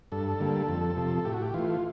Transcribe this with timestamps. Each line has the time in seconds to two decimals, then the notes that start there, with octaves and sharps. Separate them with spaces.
0.12 G2 A4
0.40 D3 G3 A#3
0.68 F2
0.97 C3 F3
1.25 A2 G4
1.34 F#4
1.42 G4
1.54 E3 A3 F4